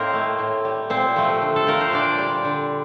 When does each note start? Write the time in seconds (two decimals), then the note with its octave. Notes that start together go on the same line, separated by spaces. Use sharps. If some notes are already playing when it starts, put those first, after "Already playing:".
Already playing: A2 A#3 C4 D#4 A#4 C5 D#5
0.13 A3
0.39 A2
0.65 G3
0.90 A#2 C4 C5
1.16 F3 A3
1.42 D3
1.56 A4
1.67 F3 A3 A#4
1.81 C5
1.91 A#2 D4 D5
2.18 G3
2.45 D3